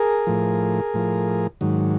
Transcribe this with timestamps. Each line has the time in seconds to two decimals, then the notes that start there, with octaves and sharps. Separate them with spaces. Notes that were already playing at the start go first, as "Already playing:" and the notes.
Already playing: G#4 A#4
0.27 A2 F3
0.94 A2 F3
1.61 G#2 D#3 F#3